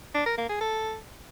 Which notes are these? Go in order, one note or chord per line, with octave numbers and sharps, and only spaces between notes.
D4
A#4
A#3
G#4
A4